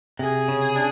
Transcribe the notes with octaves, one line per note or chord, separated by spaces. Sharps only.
C3 G#4
C#3
D4